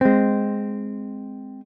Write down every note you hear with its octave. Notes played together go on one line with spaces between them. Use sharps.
G#3 C4